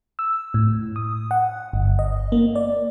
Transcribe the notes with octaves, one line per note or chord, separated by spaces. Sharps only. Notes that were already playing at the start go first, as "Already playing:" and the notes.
E6
A2
D#6
F#5
G1
D#5
A#3
D5